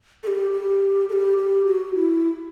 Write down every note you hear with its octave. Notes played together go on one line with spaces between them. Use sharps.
A4
G4
G4
A4
G4
G4
F#4
E4